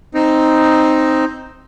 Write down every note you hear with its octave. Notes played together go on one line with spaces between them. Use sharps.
C4 D#4